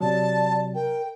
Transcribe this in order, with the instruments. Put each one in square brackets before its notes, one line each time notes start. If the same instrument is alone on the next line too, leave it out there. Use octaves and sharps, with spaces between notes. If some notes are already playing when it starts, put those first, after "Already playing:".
[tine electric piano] C3 F#3 [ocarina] D5 [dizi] A5
[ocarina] A#4 [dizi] G5